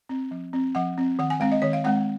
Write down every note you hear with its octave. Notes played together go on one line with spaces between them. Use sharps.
C4
F3
C4
F3 F#5
C4
D#3 F#5
G#5
G#3 C4 F5
D#5
D#3 C#5
F5
G#3 C4 F#5